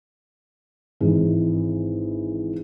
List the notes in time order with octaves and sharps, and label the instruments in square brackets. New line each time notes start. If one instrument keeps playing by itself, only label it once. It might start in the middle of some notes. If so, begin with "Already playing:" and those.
[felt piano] G#1 E3 D#4 G#4